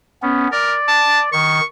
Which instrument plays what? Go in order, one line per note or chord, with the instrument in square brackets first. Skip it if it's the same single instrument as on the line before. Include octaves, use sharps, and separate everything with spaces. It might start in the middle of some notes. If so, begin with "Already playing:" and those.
[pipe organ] B3 C#4
[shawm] A#4 [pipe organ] D5
[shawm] A5
[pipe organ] D#3 [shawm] C#6